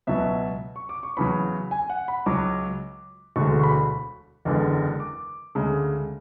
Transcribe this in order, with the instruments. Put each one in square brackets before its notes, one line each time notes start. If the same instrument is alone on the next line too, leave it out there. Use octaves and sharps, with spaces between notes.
[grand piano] C#2 B2 F#3 E5
C#6
D6
C#6
E2 C#3 F#3 B5
G#5
F#5
B5
C#2 C#3 F#3 D6
E1 D2 D3 G#3 C#6
C#6
B5
F#1 E2 D3 G#3
D6
D2 C#3 G#3